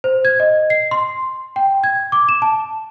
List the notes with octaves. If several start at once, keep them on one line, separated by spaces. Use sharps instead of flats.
C5
G#6
D#5
C7
C6
G5
G#6
D6
E7
A5